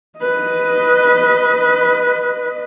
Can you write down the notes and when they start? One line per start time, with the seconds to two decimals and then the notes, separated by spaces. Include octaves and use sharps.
0.19 B4 D#5